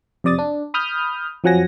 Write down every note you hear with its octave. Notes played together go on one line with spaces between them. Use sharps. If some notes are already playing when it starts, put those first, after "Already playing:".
F2 C3 D5 D#6 A6
D4
B5 D#6 F6 G6
F2 F3 F#3 F#5 G#5 A#6